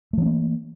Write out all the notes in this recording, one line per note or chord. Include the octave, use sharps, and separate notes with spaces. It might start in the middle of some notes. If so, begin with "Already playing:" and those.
E3 A3 A#3 C4